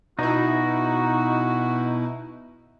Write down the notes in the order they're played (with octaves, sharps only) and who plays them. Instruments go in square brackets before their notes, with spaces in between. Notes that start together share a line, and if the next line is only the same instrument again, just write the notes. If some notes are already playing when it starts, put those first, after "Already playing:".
[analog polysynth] B2 E4 [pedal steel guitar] D#4 [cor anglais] F#4